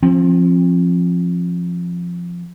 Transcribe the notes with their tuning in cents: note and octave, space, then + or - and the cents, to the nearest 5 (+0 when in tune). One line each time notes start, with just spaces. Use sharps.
F3 +0 C4 +35